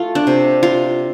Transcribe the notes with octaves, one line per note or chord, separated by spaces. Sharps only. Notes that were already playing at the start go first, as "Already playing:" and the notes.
Already playing: A3 F4
D4
C3
F4